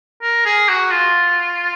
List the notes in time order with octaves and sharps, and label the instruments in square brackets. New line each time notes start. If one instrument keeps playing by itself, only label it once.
[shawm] A#4
G#4
F#4
F4